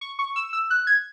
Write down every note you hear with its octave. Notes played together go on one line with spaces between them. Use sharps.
C#6
C#6
E6
E6
F#6
G#6